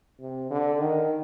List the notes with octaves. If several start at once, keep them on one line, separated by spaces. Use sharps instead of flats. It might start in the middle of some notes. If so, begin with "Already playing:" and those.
C3
D3
D#3